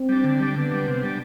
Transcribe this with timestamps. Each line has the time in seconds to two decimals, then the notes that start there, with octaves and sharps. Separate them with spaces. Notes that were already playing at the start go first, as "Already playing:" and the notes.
Already playing: C4
0.09 G3 D4
0.24 D3
0.39 G3 D4
0.56 D3 B3
0.71 G3 D4
0.88 C3
1.03 G3 D4